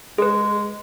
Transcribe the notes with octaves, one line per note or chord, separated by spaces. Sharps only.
G#3 G#4 B4